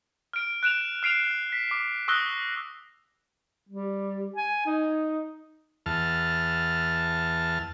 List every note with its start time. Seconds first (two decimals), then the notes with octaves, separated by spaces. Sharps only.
0.33 F6 D7
0.63 F#6 D7 E7 F7
1.03 F6 C7 D7 F7
1.52 B6
1.71 D6
2.08 C#6 D#6 E6 F#6 A#6 G7
3.69 G3
4.36 G#5
4.66 D#4
5.86 E2 A5 F6